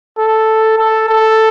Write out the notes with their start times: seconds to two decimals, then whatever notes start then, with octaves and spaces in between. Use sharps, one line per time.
0.18 A4
0.78 A4
1.08 A4